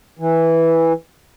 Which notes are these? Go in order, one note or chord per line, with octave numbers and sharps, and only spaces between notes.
E3